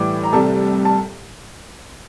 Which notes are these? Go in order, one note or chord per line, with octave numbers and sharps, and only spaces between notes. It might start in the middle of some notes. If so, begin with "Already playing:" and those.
Already playing: A2 E3 G3 D5 D6
A#5
C2 C3 G3 A4 A5
A5